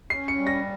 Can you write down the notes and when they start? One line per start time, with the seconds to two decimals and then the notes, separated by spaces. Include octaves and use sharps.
0.10 C#4 C7
0.28 C#7
0.37 G3
0.47 A#6